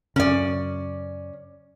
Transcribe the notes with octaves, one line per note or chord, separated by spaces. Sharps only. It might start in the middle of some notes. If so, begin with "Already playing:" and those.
F#2 C#3 C#4 D5